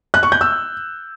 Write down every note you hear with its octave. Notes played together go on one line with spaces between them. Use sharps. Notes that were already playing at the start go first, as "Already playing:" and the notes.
F#6
C#6
G6
E6